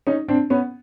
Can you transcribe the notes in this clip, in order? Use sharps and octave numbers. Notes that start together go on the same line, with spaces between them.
C#4 D#4
C4 D4
B3 C#4